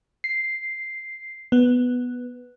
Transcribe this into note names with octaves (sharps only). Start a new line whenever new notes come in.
C7
B3